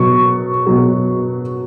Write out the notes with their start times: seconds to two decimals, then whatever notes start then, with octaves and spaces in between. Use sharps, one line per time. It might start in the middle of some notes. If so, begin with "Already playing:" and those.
Already playing: B2 F#3 C#6
0.67 B2 F#3